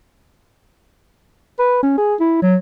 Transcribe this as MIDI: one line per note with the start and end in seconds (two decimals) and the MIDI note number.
1.59 1.79 71
1.83 1.97 61
1.98 2.15 68
2.20 2.40 64
2.42 2.56 54